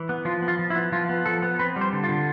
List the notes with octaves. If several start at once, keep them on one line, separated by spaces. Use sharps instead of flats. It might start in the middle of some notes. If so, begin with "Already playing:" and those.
Already playing: E3
B3
F3 F4
B3
F4
F3
E4
B3
F3 F4
B3
F3 A4
B3
C4 B4
G3
C5
D3
F4
D3